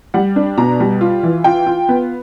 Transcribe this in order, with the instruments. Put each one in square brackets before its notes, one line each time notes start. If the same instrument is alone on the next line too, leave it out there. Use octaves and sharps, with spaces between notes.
[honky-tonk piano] G3 F#5
D4
B2 A#5
G3
F4
E3
F4 G5
F4
B3